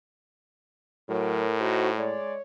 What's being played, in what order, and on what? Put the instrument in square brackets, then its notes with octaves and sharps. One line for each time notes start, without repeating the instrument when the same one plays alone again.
[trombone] A2 [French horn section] F#3 [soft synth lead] A#4
[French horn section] D#4 F#4 [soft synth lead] C5
[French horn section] G#3 D5 [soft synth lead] C#5